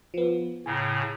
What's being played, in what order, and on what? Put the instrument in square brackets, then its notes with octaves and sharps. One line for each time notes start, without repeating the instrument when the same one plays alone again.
[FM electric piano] F3 B3
[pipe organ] A2 C#3 [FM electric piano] G#5 A#5